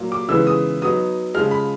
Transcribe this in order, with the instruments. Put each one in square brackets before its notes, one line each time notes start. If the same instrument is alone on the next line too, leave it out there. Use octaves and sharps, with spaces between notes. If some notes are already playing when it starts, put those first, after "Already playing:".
Already playing: [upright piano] A#2 F#3 A#3
D6
C#3 E3 G#3 B3 D#4 E6
D#6
F#3 B3 D#4 D#6
C#3 F3 G#3 F6
B5